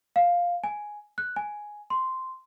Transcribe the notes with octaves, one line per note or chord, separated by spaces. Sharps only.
F5
G#5
F#6
G#5
C6